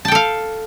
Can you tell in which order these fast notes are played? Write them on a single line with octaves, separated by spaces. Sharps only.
A5 G5 A4 F5